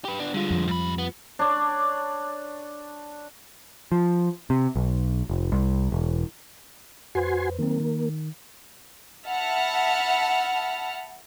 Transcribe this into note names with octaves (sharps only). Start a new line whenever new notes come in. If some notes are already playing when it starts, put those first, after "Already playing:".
G4 B4
B3 D4
D3 G3 G#3 F4
F2 F3
G#2 B5
B3
D4 C#5 D5
F3
C3
B1
F1
C2
E1
F2 F#4 B4 C5 G#5 C6
D#3 F#3 A#3 C4
D#3
E5 F#5 A5 B5 F6